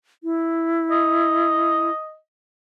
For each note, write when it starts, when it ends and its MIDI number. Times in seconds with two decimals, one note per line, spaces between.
0.24 1.90 64
0.91 2.17 75